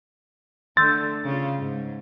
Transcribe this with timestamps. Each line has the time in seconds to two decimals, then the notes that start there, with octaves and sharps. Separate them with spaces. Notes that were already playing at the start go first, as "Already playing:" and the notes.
0.77 D3 A3 C6 E6 G6 A6
1.24 C#3 F4
1.59 G#2